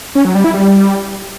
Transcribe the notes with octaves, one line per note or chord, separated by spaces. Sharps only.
C#4
F#3
G3
E4
G3